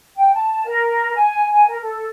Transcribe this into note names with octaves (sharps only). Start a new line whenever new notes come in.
G5
A5
A#4
G#5
G#5
A#4
A4